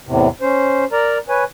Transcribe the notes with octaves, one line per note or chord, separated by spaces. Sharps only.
E2 A2 C3
C#4 C5
A#4 D5 A#5
B4 C#5 G#5